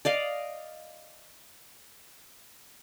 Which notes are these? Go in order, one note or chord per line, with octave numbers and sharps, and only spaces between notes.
D5 D#5 F5